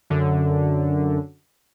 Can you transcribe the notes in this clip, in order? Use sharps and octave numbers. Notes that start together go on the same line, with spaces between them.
F#2 D3